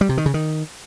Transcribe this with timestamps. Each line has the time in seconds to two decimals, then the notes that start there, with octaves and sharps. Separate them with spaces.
0.01 G3
0.09 C3
0.17 D#3
0.26 C#3
0.34 D#3